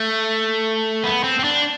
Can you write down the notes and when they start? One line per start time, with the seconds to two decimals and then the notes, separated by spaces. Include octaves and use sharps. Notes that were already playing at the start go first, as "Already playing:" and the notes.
Already playing: A3
1.04 B3
1.24 C4
1.39 C4
1.44 D4